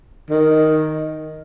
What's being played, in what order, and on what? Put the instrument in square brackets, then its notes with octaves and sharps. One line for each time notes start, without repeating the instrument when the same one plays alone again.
[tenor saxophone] D#3